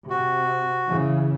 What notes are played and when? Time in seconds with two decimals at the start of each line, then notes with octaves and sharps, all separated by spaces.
0.10 C3 F#4
0.89 C#3 E3